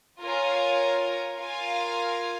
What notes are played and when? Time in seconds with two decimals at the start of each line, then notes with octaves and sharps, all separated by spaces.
0.20 F4 A#4 C#5 G#5
1.38 F4 A#4 F5 G#5